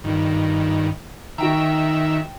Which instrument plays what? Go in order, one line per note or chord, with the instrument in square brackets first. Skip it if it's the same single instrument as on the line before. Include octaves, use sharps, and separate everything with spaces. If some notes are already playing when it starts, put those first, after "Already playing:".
[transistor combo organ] G2 D#3
[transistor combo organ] D#3 E5 [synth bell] F#4 G5 A#5